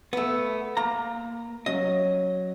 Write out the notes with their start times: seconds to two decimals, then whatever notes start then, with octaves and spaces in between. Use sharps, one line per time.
0.13 A3 B3
0.77 A#3 A#5
1.66 F#3 C#4 D#5